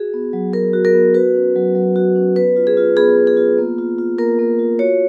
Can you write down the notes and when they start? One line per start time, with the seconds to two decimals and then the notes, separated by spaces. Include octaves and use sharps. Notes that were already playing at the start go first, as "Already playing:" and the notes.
Already playing: F#4 G#4
0.14 B3
0.33 F#3
0.53 F#3 A#4
0.73 F#4
0.85 A#4
0.94 B3
1.14 F#4 B4
1.35 C#4
1.56 F#3
1.75 F#3
1.96 F#4
2.16 C#4
2.36 B3 B4
2.56 F4
2.67 G#4
2.77 F4
2.97 B3 G#4
3.17 B3
3.27 G#4
3.37 F4
3.58 A#3
3.78 F4
3.98 F4
4.19 A#3 A#4
4.39 A#3
4.59 F4
4.79 F#4 C#5